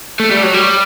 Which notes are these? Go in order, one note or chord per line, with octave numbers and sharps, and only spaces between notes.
A3
G3
F#3
G3